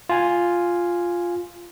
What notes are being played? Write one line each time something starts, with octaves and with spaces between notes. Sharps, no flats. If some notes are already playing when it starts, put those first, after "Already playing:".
F4 G#5